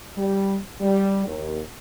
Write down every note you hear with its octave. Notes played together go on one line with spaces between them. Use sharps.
G3
G3
D#2